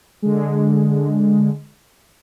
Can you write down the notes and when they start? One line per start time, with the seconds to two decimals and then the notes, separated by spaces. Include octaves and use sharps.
0.22 D3 G#3